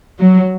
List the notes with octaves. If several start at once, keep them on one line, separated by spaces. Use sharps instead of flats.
F#3